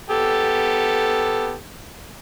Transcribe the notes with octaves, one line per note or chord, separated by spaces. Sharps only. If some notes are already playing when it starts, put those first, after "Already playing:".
B3 G4 A4